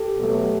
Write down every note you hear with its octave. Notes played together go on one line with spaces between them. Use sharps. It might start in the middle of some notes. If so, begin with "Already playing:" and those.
Already playing: G4 A4
B2 F#3 A3